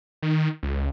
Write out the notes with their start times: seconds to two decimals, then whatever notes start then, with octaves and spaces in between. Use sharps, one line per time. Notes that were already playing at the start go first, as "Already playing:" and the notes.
0.22 D#3
0.63 C#2